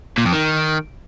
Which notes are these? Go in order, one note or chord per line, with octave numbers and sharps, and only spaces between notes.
A#2
F2
D#3